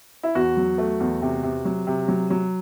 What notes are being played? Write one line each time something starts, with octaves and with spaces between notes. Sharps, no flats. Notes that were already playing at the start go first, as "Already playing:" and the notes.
E4
E2 F#4
F#3
A3
E2
C3
C3
F#3
C3
F#3
F#3